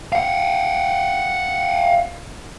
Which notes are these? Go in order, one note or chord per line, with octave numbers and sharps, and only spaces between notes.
F5 F#5